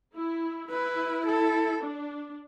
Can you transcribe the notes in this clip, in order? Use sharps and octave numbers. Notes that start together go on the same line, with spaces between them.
E4
E4 B4
A4
D4